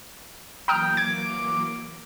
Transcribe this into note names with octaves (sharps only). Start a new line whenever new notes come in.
E3 F#3 A#3 G5 A#5 D#6 F6
D6 G#6